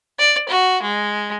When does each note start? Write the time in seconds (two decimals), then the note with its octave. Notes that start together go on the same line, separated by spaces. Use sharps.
0.19 D5
0.48 F#4
0.82 G#3